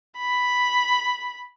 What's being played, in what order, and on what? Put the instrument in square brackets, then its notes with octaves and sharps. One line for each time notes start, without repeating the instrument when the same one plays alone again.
[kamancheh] B5